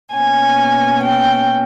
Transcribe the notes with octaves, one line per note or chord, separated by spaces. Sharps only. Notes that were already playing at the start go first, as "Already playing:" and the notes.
B2 A#3 C#4 G#5
G5